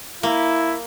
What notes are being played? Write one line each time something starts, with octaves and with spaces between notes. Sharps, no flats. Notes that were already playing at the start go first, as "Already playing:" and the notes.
A#3 E4